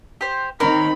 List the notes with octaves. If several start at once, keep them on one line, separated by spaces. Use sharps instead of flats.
G4 C5
D#3 C4 D#4 A#4 C#5 F5 B5